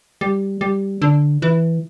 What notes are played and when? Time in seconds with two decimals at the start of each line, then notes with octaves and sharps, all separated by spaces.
0.21 G3
0.61 G3
1.02 D3
1.42 E3